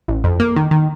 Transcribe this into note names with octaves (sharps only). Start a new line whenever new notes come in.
A1
F2
A#3
D#3
D#3